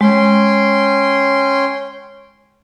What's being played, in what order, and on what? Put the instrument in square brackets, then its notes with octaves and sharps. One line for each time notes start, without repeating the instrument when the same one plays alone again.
[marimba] G#3 [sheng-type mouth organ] C#4 G5 C6